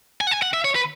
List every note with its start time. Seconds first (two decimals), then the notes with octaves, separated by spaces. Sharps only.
0.21 G#5
0.27 F#5
0.31 G#5
0.42 F#5
0.54 E5
0.65 C#5
0.75 B4